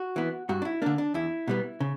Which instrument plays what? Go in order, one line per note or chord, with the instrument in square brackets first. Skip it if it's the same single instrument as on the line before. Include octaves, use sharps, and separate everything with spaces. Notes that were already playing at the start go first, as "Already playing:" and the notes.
Already playing: [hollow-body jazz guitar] F#4
E3 B3
G2 F#4
D4
E4
D3 A#3 D4
D4
E2 E4
B2 G3 B3
C#3